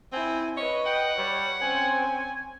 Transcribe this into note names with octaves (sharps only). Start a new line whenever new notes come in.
C4 E4 G#5
B4 C#5 D#5
F#5 G5
G3 C#5
C4 C#4 G#5